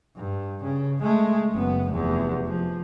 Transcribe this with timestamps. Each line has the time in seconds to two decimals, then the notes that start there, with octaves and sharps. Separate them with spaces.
0.16 G2
0.63 C#3
1.02 G#3 A3
1.52 F#1 B3
1.89 F1 E2
2.46 F3